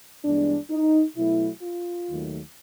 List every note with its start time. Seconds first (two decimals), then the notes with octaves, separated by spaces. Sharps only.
0.25 G2 E3 G#3 B3 D4
0.71 D#4
1.16 B2 F#3 A3 E4
1.63 F4
2.09 D#2 D#3 F#3 A3